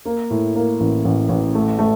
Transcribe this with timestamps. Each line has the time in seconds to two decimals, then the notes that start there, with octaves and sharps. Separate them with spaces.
0.05 A#3
0.30 A2
0.55 A#3
0.80 A1
1.05 A1
1.29 A1
1.55 A3
1.79 A3